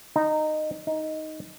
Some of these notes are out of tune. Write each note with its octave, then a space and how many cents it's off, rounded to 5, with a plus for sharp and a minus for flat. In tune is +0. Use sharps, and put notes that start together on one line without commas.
D#4 -15
D#4 +5